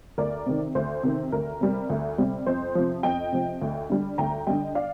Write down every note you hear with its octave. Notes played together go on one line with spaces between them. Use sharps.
D2 A#4 D5
C3 D#3
D2 C5
C3 D#3
D2 A#4
C3 G3
D2
C3 G3
F2 C5
C3 F3
F2 D#5 G5
C3 F3
D2
D3 G3
D2 G5 A#5
D3 G3 D#5 G5
D5 F5